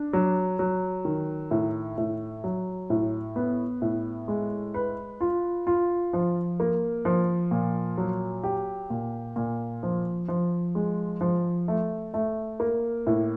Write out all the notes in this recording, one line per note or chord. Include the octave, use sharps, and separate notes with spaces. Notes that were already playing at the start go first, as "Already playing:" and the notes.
Already playing: D4
F#3
F#3
D#3
A2
A2
F#3
A2
B3
A2
G#3
B4
F4
F4
F3
A#3
F3
A#2
F#3
G4
A#2
A#2
F3
F3
G#3
F3
A3
A3
A#3
A2